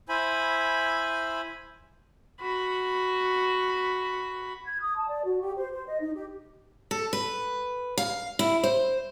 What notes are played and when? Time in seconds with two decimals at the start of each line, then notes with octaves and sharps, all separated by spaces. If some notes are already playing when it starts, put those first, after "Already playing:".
0.09 E4 C5 G#5 B5
2.41 F#4 B5
4.66 G#6
4.81 D#6
4.96 A5
5.08 D5
5.24 F#4
5.41 G4
5.57 C5
5.71 C5
5.86 D#5
6.01 D#4
6.14 G4
6.91 A4
7.13 B4
7.98 F5
8.39 E4
8.64 C5